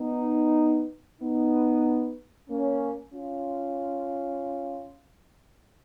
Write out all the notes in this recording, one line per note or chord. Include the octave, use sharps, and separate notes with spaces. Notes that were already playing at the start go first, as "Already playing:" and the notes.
Already playing: B3 D#4
B3 D#4
A#3 C#4
C#4 F4